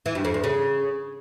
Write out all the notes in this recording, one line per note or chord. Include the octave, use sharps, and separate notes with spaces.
E3
G2
F2
E2
C#3